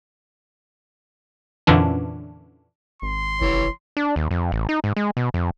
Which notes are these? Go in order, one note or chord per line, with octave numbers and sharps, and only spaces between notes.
F2 A#2 D3 E3 C#4 D4
G#1 C6
F1 E3 C#5
D4
D#2
F2
A1
D#4
G#2
G#3
B2
F2